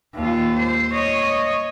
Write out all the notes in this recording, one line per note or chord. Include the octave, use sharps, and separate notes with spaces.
D#2 F4
C5
C#5 D#5